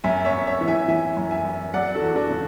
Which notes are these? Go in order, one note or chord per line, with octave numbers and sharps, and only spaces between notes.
F#2 E5 G#5
C#5 E5
F#2
C#5 E5
E3
E5 G#5
E3 E5 G#5
F#2
E5 G#5
F#2
F#3 D5 F#5
F#4 A4
E2
D4 F#4
C#3